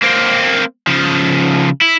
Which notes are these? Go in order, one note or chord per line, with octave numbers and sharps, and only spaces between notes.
A#3 C4
C#3 F3
E4